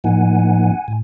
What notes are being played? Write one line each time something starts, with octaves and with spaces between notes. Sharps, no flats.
A2 F3 A#3 D#4 F#5 G#5
A2